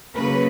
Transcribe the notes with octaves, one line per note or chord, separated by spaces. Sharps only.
C#3 F#3 A#3 C#4 B4